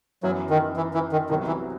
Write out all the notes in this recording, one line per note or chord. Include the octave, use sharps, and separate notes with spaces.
F#2 E3 F#3 B3
D#3
E3
E3
D#3
C2 C3 D#3 F#3 B3 F#4
E3